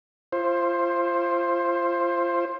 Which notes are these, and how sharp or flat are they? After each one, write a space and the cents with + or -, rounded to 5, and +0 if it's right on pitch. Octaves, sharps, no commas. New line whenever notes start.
F4 -30 C5 +15